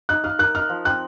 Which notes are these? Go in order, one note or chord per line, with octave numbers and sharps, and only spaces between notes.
D#4 F#6
F5 F6
A#4 F#6
D#4 F6
F3
C4 F#6